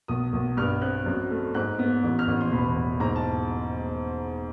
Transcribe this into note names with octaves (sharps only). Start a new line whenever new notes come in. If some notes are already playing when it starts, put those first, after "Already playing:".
B1 D#6
B1
G2 F6
C4 F#6
F#2
A3
G#2 F#6
B3
A1
F6
A1
C6
E1 B5
E1
G#2 A#5
A5